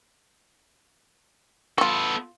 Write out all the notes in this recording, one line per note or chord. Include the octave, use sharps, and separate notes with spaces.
B3 F4 F#4 A4